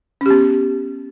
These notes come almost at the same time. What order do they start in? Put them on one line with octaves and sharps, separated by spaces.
C#4 G4 B3